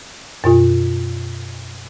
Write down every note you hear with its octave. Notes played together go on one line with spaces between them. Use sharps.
F#2 B2 F4